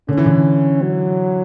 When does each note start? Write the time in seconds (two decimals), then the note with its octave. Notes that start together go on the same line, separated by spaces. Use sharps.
0.09 D3 C#4
0.17 E3
0.26 D3
0.82 F#3